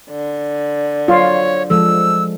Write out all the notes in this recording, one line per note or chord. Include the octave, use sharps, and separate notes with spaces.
D3
F#3 F4 C5 C#5
F3 G#3 A4 E6